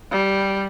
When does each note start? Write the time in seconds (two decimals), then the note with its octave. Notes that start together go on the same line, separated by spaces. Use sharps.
0.11 G3